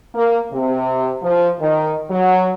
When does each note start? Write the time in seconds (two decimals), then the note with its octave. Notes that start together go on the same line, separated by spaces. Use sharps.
0.15 A#3
0.53 C3
1.23 F3
1.60 D#3
2.10 F#3